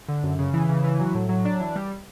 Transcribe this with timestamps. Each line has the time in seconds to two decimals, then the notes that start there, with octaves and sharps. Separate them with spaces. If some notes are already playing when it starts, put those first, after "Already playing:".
0.08 D3
0.23 F#2
0.39 C#3
0.54 E3
0.69 C#3
0.84 E3
1.00 F#3
1.14 A2
1.29 F#3
1.45 D4
1.60 E3
1.76 G3